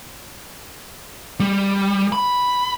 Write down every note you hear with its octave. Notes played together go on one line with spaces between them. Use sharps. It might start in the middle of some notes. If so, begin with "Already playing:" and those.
G3
B5